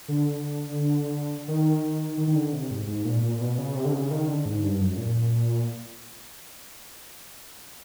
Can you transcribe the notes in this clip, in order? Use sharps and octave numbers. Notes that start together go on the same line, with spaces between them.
D3
D#3
D#3
D#3
D3
C3
G#2
G#2
A#2
A#2
B2
C#3
C3
D3
C#3
D#3
D3
G#2
G2
F#2
A#2